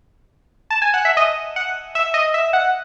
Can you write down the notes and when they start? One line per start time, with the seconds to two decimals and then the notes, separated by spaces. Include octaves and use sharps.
0.70 A5
0.82 G#5
0.94 F#5
1.05 E5
1.17 D#5
1.56 F#5
1.95 E5
2.14 D#5
2.34 E5
2.53 F#5